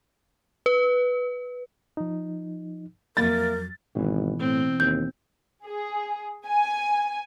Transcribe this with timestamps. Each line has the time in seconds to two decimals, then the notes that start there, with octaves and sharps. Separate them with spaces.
0.66 B4
1.97 F3 D#4
3.17 F2 F#3 A#3 A#4 E5 A6
3.96 G#1 B2 E3
4.39 A2 C4
4.80 D#2 G6
5.65 G#4
6.47 G#5